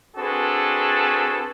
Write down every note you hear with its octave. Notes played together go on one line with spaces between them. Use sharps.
C4 D4 F#4 G#4 A4 B4